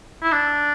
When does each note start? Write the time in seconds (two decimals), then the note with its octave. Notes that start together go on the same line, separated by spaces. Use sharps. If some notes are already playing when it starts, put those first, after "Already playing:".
0.23 E4
0.32 D4